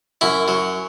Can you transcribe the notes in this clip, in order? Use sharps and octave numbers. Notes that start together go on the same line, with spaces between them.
F#2 E4
F#3